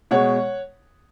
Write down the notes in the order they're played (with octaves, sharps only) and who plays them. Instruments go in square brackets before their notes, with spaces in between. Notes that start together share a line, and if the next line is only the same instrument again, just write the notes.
[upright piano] B2 G#3 C#5 F#5